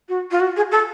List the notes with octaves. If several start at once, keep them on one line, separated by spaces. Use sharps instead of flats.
F#4
F4
F#4
G#4
A4